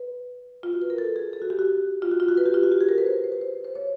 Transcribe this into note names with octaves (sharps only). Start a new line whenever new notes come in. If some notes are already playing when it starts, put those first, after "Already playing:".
Already playing: B4
F4
F#4
B4
A#4
A4
G#4
A4
F#4
G4
F#4
F4
F#4
F4
F#4
B4
G4
F4
F#4
G4
G#4
A#4
B4
C5
C5
B4
C5
C5
C#5